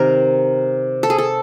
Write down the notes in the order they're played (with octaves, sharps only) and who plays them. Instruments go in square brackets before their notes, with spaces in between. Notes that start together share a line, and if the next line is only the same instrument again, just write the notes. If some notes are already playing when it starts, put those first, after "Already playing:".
Already playing: [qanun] C3 D#3 A#4
A4
G#4
A4